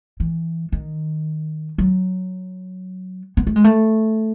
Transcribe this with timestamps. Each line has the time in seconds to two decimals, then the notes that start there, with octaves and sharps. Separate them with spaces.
0.20 E3
0.72 D#3
1.78 F#3
3.37 B3
3.47 A3
3.56 G#3
3.64 A3